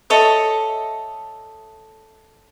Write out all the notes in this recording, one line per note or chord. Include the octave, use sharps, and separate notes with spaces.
A4 C#5 D#5 E5